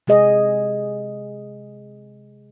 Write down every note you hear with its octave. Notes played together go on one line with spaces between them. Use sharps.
C3 G#3 G#4 D#5